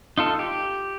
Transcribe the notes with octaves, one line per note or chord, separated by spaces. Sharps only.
D#4 F4 A4
G4